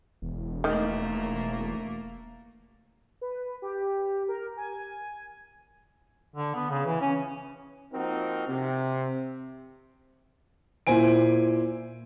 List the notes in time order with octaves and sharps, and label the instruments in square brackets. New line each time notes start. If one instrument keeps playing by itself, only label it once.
[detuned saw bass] E1
[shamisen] D#3 [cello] A3 A#3
[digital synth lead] B4
G4
A#4
G#5
[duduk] D3
B3
C#3
E3
C#4
[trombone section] F3 A#3 C4 D#4 F#4 A#4
C3
[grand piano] A#2 E4 C5 G#5 D7